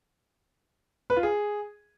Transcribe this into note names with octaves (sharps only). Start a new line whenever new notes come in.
B4
F4
G#4